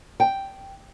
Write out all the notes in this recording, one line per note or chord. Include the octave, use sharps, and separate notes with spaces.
G5